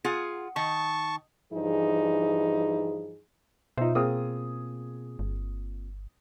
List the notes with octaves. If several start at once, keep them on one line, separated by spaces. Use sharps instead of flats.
F4 G#4 F#5
D#3 A5 C#6
G2 E3 F3 D#4 G#4
B2 D#4 F4 C5 E5
A#3 C4 F4 G#4 D#6
G1